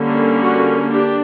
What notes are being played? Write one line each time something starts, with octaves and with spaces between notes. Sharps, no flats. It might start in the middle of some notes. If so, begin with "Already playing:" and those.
Already playing: D3 G3 A#3 C#4
F#4
D4 G4